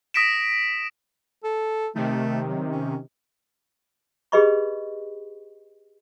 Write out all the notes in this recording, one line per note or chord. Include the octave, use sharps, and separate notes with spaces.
D#6 A#6 B6 D7 E7
A4
C3 D#3 A3
F#3
C#4
G4 G#4 B4 D#5 B5 C#6